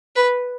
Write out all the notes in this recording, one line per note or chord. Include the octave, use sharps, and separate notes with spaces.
B4